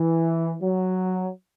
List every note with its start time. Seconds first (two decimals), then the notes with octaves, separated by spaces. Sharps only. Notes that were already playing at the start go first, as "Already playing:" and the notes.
Already playing: E3
0.62 F#3